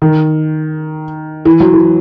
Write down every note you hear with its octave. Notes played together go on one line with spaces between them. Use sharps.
D#3
E3
F#3
E3